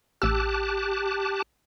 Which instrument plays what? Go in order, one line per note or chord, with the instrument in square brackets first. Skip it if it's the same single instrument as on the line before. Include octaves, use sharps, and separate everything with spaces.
[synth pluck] A1 E6 [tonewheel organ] G4 A5 F#6